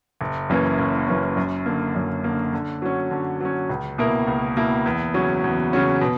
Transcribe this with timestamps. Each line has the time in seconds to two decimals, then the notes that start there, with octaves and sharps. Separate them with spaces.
0.21 F#1
0.49 F#2 E3 A#3 C#4
0.79 F#1
1.08 F#2 E3 A#3 C#4
1.37 F#2
1.66 D3 A#3
1.96 F#2
2.24 D3 A#3
2.53 D3
2.82 F#3 C#4
3.11 D3
3.41 F#3 C#4
3.69 C#2
3.98 B2 A#3 E4 A#4
4.27 C#2
4.56 B2 A#3 E4 A#4
4.86 E2
5.14 C#3 F#3 C#4
5.44 E2
5.73 C#3 F#3 C#4
6.01 B2